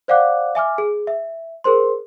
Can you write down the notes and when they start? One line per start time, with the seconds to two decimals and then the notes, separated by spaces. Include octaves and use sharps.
0.08 C5 D5 F5 F#5 D6 F#6
0.55 E5 G#5 D6 F6
0.78 G#4
1.07 E5
1.64 G#4 A#4 C5 C6